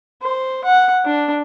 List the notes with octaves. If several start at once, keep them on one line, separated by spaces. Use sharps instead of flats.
C5
F#5
D4